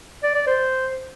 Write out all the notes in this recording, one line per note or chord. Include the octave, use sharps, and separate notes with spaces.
D5
D5
C5